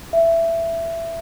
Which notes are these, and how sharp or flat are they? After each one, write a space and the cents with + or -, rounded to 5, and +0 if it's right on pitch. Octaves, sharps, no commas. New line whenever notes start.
E5 +15